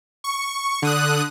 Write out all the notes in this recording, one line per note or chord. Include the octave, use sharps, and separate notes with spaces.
C#6
D3 D#6 F#6